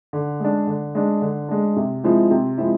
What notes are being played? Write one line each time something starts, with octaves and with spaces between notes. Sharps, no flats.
D3
G#3 D4
D3
G#3 D4
D3
G#3 D4
C3
F3 G#3 C4 E4
C3
F3 G#3 C4 E4